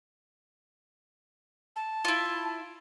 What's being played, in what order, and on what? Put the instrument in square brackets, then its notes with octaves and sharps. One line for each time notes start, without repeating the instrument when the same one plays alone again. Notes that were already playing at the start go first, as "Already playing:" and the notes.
[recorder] A5
[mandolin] E4 F4